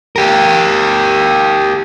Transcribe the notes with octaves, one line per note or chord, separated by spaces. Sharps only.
G4 A#4